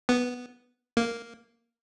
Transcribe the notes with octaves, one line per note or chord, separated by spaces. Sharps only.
B3
A#3